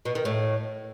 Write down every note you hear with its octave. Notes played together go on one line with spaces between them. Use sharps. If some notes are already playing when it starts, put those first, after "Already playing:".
B2
D#3
A2